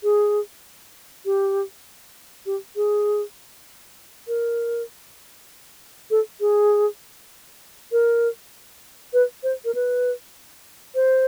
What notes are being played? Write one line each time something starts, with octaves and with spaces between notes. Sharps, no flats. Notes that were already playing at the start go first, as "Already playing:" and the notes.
G#4
G4
G4
G#4
A#4
A4
G#4
A#4
B4
C5
A#4
B4
C5